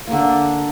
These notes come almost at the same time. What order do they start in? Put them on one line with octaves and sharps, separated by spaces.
A#3 D3 D4